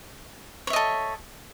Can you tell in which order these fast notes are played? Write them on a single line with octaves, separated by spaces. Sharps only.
C#5 E5 D#5 A4